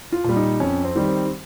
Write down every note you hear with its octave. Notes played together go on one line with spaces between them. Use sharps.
F4
A#2 G3
D#4
F2 C#4
C4
D#3 G3
C4